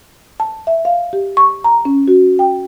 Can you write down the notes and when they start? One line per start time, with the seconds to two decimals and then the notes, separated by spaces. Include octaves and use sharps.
0.40 A5
0.67 E5
0.85 F5
1.13 G4
1.37 C#6
1.64 A#5
1.85 C#4
2.08 F#4
2.39 G5